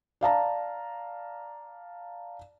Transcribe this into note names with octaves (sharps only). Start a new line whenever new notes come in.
D5 F5 A5 A#5